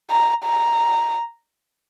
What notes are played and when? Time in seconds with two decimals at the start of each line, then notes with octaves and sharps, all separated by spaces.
0.11 A#5
0.44 A#5